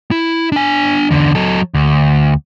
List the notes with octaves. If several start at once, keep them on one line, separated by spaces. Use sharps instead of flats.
E4
D4 G#5
E2 D3
F#3 A4
D2